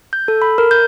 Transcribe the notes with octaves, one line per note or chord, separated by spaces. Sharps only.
G6
A4
B5
A#4
G6